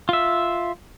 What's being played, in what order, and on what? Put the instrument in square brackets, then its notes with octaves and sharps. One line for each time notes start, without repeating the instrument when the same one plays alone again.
[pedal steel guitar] F4 E5